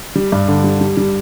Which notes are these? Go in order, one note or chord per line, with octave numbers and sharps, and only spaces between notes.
G3
G2
D3
G3
G3
G3